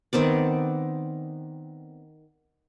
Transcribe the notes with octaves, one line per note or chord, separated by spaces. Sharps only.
D#3 B3 C4 D5